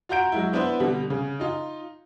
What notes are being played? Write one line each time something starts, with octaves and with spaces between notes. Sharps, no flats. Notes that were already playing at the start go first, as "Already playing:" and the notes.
F4 F#4 A#5 G6 D7
F#3 G#3 E4
B3 D4 E4 B4 C5
B2 D3 G3
C#3
D#4 F4